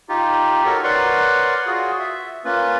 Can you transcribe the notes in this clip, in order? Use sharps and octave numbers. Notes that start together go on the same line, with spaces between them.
D#4 F4 G4
D#4 F#4 A4 A#4 C#5
A#4 B4 C#5 D5 F#5 C6
F4 F#4 G#4
E5
A#3 C#4 F4 B4